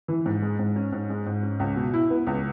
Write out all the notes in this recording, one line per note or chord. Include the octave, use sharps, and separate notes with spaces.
E3
G#2
G#3
G#2
C#4
G#2
G#3
G#2
C#4
C#2
B2
E4
B3
C#2